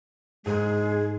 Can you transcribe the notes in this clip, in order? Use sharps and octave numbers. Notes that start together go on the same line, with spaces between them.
G#2 G#3 G#4